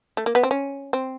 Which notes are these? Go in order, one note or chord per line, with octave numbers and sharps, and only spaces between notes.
A3
A#3
B3
C4
C#4
C4